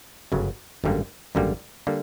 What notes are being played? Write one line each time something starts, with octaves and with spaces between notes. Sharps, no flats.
G1 F#2 C#3 F#3
G#1 F#2 D3 G3 A#3
G#1 F#2 D3 G3 A#3
D3 G3 A#3